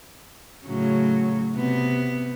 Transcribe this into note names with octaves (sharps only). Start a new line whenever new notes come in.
A2 C#3 F#3
C3 B3